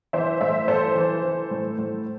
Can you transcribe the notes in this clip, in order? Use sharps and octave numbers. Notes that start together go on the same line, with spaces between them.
E3 C5 E5
A2 C5 E5
E3 A4 C5
E3
E3
A2
A2